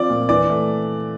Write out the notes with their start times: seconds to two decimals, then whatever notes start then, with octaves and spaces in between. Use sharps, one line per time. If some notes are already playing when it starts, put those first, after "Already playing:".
Already playing: F3 C4 F4 D5
0.09 A#2
0.29 E3 D5
0.50 A3